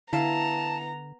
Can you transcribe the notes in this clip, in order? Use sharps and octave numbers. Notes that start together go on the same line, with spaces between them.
D3 B3 E4 F5 A5 A#5